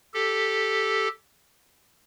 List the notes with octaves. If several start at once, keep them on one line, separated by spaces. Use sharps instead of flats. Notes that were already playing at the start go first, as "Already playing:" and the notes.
G4 A4